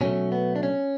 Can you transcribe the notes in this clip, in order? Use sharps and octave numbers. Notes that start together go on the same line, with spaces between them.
B2 F#3 A3 C#4
B3
D4
C#4